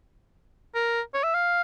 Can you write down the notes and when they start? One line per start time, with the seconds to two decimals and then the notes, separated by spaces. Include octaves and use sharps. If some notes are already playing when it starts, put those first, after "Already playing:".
0.75 A#4
1.14 C#5
1.24 E5
1.34 F5